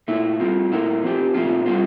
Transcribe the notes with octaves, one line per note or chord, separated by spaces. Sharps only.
A#2 A3 E4
G3 C4 F4
A#2 A3 E4 A#4
F3 C4 G4
A#2 A3 C4 F4
G3 C4 F4